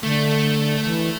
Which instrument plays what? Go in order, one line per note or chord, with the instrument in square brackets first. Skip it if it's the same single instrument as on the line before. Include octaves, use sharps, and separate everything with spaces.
[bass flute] D3 [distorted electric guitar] A3
[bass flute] E3